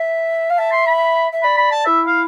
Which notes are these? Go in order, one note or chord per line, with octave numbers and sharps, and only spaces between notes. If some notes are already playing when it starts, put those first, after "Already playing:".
Already playing: E5
F5
E5 A5
C6
B5
E5
D5 B5
B5
A5
E4 E5
F5